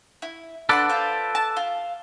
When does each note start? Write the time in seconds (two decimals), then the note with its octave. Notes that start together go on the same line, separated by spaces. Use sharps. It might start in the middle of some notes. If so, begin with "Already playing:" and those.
0.22 E4
0.69 D4 A4 B4 D5 F#5 C6
0.89 F4 C5
1.35 A5
1.57 F4